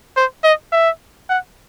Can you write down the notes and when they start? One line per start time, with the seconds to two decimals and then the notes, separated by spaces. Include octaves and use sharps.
0.17 C5
0.44 D#5
0.72 E5
1.29 F#5